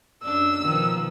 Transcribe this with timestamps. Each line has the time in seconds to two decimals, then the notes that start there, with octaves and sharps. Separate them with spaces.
0.23 F#2 D4 E6
0.63 B2 D#3 F3